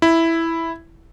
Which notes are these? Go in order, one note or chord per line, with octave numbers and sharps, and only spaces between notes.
E4